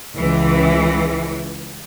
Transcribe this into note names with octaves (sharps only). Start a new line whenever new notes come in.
C#2 E3